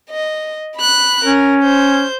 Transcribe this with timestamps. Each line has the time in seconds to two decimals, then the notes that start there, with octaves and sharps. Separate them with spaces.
0.10 D#5
0.77 B5 F#6
1.24 C#4 A#4
1.63 C5 G6